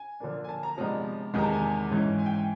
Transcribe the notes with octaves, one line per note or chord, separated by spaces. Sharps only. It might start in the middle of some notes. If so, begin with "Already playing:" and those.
Already playing: G#5
D3 F3 A#3 D4
G#5
A5
A#5
C3 F3 G#3 B3 D4
E2 C3 D#3 G#3 B3 A#5
A5
G#5
G#2 E3 G#3 C#4
G#5
G5
G#5